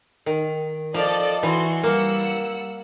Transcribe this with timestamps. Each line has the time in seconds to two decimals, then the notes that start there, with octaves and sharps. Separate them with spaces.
0.26 D#3
0.94 F3 A4 D5 D#5
1.43 E3 F#4 C6
1.83 G3 A#3 F#5 E6